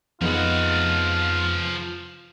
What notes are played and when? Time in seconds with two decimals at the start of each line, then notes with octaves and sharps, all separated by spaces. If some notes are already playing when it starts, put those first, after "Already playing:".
0.21 F2 F3 B3 D#4 F4 G#4 F#5